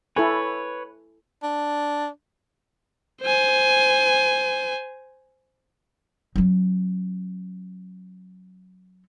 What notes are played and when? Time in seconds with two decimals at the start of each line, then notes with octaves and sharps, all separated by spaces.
0.16 E4 A4 B4 C#5 G#5
1.43 D4
3.22 C5 G#5
6.36 F#3 C#4